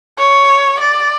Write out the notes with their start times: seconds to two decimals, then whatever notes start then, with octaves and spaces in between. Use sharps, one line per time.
0.18 C#5
0.80 D5